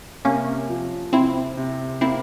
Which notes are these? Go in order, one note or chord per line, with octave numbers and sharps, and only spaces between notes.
C3 A#3 C#4
F3
C3 C4 E4
C3
A#3 C4 E4